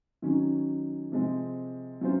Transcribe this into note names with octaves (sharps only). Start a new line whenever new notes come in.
D#3 F#3 C#4
C3 F3 G#3 C4
F#3 C#4 F4 C5